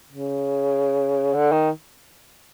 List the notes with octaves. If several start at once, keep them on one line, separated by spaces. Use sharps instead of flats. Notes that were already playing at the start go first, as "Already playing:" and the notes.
C#3
D3
D#3